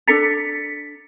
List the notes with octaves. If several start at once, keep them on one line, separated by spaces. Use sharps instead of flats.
D4 A4 A#5 A6 B6 C#7